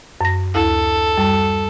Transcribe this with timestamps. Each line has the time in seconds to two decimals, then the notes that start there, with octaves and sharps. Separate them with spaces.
0.21 F#2 A#6
0.55 D2 E4 A4
1.17 F#2 G3